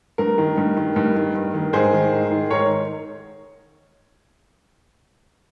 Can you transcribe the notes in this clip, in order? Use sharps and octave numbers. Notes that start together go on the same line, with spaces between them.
G2 A#4
D#3
G2
D#3
G2
D#3
G2
D#3
G#2 G#4 C5
D#3
G#2
D#3
G#2 A#4 C#5